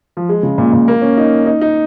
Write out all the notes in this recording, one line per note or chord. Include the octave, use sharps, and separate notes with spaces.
F3
G#3
C#3
A#2
A#2
A#3
C#4
D#4
D#4
D#4